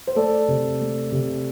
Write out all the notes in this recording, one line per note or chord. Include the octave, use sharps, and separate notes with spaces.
C5
A3 A4 D5
C3
A3
C3